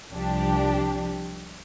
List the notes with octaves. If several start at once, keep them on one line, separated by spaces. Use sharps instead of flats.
C2 F3 D4 G4